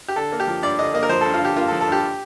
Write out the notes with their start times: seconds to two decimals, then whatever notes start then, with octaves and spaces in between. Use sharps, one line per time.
0.08 G4
0.16 D3 A4
0.32 A#3
0.40 G4
0.47 F3
0.63 G2 D5
0.79 D3 D#5
0.94 A#3 D#5
1.03 A#4
1.09 F3 C5
1.21 A4
1.25 G2
1.34 F4
1.41 D3 G4
1.57 A#3 F4
1.68 A4
1.72 F3
1.81 A4
1.87 G2 G4